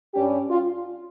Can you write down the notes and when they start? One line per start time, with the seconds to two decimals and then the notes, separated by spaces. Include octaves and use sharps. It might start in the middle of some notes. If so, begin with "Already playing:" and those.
0.14 G2 G3 C#4 G4
0.49 F4